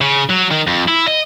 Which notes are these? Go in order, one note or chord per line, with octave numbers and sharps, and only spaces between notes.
C#3
F#3
D#3
F2
E4
D#5